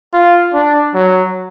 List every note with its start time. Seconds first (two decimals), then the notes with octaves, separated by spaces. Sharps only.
0.13 F4
0.54 D4
0.94 F#3